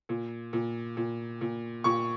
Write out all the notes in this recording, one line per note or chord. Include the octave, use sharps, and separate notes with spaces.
A#2
A#2
A#2
A#2
A#2 C#6